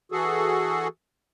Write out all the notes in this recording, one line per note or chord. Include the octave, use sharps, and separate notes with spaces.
E3 F#4 G#4 A4